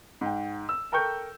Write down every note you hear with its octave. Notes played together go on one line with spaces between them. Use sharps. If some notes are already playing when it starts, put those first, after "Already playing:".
G#2 G5
E6
A4 A#4 G5 C#6 G6